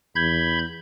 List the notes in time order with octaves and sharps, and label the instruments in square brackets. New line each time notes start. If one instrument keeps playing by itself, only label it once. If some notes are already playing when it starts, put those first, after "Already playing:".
[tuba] E2 [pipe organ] B5 G6 G#6